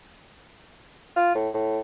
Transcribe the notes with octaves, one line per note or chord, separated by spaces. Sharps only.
F4
A2
A2